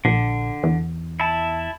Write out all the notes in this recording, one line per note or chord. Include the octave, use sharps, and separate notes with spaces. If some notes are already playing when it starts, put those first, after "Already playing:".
A#1 D3
E2
E4 A5